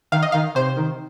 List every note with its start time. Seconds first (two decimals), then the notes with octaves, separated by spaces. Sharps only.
0.12 D#3 F5
0.23 D#5
0.32 D#3 F5
0.55 C3 C5
0.77 D#3